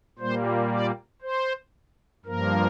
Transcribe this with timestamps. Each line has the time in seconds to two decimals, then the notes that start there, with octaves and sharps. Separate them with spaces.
0.19 A#2 G3 A#3 C5
0.71 D5
1.22 C5
2.26 G2 F3 A#3 A#4